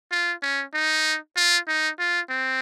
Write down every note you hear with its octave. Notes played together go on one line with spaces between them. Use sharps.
F4
C#4
D#4
F4
D#4
F4
C4